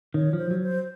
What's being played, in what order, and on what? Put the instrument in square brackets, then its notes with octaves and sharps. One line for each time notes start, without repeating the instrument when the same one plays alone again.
[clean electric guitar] D#3 [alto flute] C#5
[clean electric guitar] F3
[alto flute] C5
[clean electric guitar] F#3
[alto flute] C5